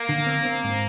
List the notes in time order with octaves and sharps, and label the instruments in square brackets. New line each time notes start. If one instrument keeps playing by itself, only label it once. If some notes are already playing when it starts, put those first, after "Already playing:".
Already playing: [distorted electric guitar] A#3
[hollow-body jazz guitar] D3
C4
C4
G#2